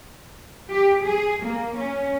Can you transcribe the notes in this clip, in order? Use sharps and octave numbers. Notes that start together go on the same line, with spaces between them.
G4
G#4
A#3
C#4